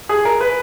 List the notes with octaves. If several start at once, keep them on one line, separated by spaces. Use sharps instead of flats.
G#4
A#4
B4